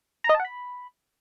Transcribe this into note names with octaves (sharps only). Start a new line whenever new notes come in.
A#5
D#5
A5
F#5
B5